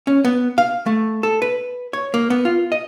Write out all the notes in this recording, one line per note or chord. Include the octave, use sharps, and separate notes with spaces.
C#4
B3
F5
A3
A4
B4
C#5
A#3
B3
F4
D#5